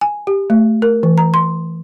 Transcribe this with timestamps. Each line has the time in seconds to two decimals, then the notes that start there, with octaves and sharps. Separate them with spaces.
0.01 G#5
0.27 G4
0.50 A3
0.82 A#4
1.03 E3
1.18 A#5
1.34 C6